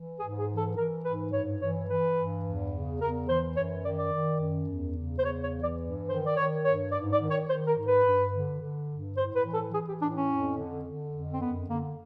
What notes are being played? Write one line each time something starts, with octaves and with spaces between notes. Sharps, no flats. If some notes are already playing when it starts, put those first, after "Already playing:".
Already playing: E3
G#2 G#4
G#4
E3
A4
E3 A#4
G#2 B4
G2 C#5
E3 C#5
E3 B4
G2
E2
C#3
E2 A#4
E3 C5
F#2 C#5
D#3 D5
D5
D#3
F#2
E2
C#3
C5
E2 C#5
C#5
E3
D5
G2
D#3 C5
D5
D#3 C#5
G2 C#5
G#2 D5
D5
D#3
C#5
D#3 C5
A#4
G#2
B4
G2
D3
D3
G2
A2 C5
B4
E3
A4
E3 G#4
G4
A2 D4
C#4
F2
D3
D3
F2
C4
F#2 B3
D3 A#3